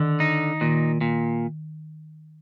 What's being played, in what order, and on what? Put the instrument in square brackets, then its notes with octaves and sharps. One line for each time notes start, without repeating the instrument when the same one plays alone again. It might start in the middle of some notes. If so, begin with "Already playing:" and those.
Already playing: [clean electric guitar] D3 [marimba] D#3
[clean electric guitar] D#4
[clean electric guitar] A#2 [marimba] D#3
[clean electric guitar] A#2